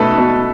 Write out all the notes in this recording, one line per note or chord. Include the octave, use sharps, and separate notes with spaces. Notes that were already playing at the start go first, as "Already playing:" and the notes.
Already playing: B2 A3 A4 B4
B2